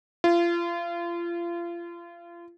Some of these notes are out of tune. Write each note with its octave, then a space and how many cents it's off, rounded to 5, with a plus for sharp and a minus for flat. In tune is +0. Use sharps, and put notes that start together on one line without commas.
F4 -30